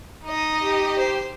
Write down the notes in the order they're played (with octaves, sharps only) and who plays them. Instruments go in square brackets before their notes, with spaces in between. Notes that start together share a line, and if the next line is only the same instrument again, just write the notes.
[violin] D#4 D#5
[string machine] G4
[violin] C5